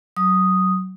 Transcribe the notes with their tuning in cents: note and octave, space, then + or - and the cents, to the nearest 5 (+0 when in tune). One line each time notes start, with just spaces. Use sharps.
F#3 +15 D#6 +0